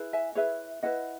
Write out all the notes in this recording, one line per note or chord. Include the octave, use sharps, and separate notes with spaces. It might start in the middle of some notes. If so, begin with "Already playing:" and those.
Already playing: E4 G#4 B4
E5 G#5
E4 G#4 B4 C#5 E5
E4 B4 D#5 F#5